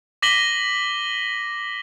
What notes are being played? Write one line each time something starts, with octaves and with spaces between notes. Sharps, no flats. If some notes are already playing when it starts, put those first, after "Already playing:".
D6 A#6 B6 D#7 F#7 G7